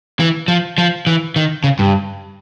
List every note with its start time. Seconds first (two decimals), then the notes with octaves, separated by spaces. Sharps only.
0.20 E3
0.48 F3
0.78 F3
1.07 E3
1.36 D#3
1.64 C#3
1.79 G2